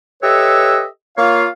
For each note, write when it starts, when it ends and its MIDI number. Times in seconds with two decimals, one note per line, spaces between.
0.23 0.85 67
0.23 0.85 69
0.23 0.85 71
0.23 0.85 73
0.23 0.85 75
0.23 0.85 76
1.18 1.47 58
1.18 1.47 65
1.18 1.47 73
1.18 1.47 77